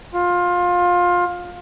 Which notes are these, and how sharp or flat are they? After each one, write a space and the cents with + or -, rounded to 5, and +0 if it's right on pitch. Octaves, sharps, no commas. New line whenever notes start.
F4 +20